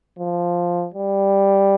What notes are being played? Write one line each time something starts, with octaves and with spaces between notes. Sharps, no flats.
F3
G3